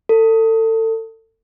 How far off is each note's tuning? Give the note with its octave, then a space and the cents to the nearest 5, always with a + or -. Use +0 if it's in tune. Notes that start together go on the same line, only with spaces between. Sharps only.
A4 +30